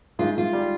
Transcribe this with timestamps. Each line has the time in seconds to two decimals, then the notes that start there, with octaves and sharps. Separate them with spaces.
0.19 G#2 F4
0.36 G#2 F4
0.53 G3